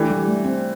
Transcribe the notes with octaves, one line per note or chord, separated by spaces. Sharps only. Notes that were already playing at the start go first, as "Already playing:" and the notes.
Already playing: E3 A3 D4 G4
G3
A3
C4